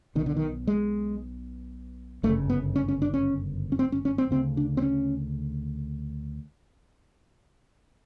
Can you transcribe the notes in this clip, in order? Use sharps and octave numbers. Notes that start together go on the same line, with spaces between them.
B1 B2 D#3
D3
D#3
G#3
G1 F#2 C#3 A3
B3
C#4
C#4
D4
C#4
C#4
C4
C#4
C#4
C4
D2 C#3 C4
D4
C4
C#4